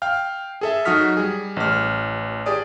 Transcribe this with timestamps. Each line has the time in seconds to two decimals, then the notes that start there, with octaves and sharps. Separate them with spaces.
0.02 F5 G5 F6
0.61 G#4 A4 E5
0.85 F#3 D#4 F#4 D#6 F6 B6
1.17 G3 G#4
1.56 A1 F6
2.46 G4 G#4 D5 D#6